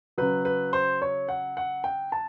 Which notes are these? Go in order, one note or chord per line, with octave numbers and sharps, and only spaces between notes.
C#3 F#3 B4
B4
C5
C#5
F#5
F#5
G5
A5